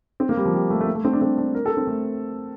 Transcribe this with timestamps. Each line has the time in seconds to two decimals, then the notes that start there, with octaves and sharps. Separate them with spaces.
0.20 C4
0.29 A#3
0.37 G3
0.45 F3
0.54 G3
0.70 A3
0.81 A3
0.87 A#3
0.95 A3
1.05 C4
1.13 D4
1.21 C4
1.38 D4
1.55 A#4
1.66 A4
1.77 C4
1.87 A3